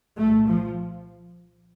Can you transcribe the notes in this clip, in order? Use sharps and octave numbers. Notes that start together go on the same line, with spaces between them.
C2 A#2 A3
F3